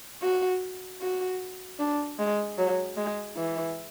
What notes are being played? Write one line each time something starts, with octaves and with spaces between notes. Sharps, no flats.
F#4
F#4
D4
G#3
F#3
G#3
E3